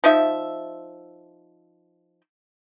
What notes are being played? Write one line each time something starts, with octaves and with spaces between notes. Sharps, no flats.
F3 D#4 E5